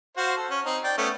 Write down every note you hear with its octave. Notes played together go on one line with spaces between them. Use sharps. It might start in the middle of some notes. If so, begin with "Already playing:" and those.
F#4 C5 F5
A4
C#4
C4 D#4
D5 G5
A3 B3 C#4